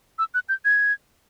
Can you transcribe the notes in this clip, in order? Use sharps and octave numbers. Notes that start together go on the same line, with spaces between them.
E6
F#6
G6
G#6